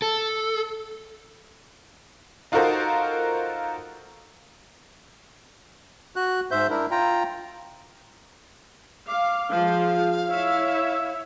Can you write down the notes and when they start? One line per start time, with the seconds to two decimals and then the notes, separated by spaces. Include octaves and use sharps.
0.02 A4
2.52 D#4 F4 F#4 A4 A#4 C5
6.16 F#4 F#6
6.51 G#2 C5 E5 G6
6.70 D4 E4 A#4
6.91 F4 G5 A#5
9.08 F5 D6
9.51 F3 G#3 F5
10.28 E4 C#5 E5